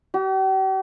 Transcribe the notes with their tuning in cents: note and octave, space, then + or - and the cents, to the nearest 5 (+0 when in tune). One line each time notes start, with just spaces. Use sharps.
G4 -45